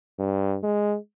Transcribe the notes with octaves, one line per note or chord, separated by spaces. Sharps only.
G2
G#3